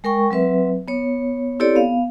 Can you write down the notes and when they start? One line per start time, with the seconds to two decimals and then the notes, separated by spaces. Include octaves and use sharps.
0.04 G#3 A#4 G5 C#6
0.31 F#3 C4 B4 E5
0.88 B3 C#5
1.59 C4 E4 G4 A4 C#5 D5
1.75 B3 F5